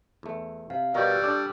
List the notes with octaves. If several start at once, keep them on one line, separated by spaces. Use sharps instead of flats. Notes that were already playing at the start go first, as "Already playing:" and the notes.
E2 A3
C3 F5
B2 G3 A#4 D5 D#5 C#6 G6
E6 F#6 A6
D4 A4 D5 D6